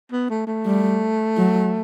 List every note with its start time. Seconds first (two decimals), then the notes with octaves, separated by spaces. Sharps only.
0.12 B3
0.30 A3
0.47 A3
0.66 G3
1.37 F#3